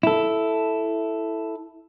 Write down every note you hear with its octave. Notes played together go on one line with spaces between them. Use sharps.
E4 A4